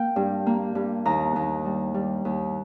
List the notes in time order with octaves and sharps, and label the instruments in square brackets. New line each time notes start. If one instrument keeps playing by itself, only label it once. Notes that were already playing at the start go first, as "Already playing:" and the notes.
Already playing: [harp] A#3 F5 G5
G2
A#3
G2
D#2 A#5
D#2
G3
G3
D#2